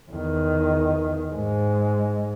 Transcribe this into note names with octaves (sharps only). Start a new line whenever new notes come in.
E2 D#3
G#2 G#3